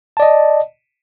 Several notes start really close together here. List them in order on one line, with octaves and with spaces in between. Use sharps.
A5 D5 D#5